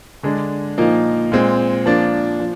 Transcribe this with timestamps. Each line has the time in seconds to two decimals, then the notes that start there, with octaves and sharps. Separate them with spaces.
0.23 D3 G#3 D4
0.78 A#2 F3 A#3 D#4
1.32 A#2 G#3 C4
1.86 F3 A#3 D4
2.40 F3